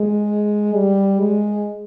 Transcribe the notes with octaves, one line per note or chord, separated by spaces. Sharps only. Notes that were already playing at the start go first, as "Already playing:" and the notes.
Already playing: G#3
G3
G#3